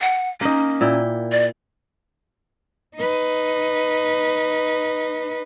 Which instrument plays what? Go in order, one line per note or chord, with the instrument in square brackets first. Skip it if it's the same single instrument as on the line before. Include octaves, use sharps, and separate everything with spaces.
[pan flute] F#5
[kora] A#3 D#4 [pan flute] C#4
[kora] A#2 E4 G5
[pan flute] D5
[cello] D#4 B4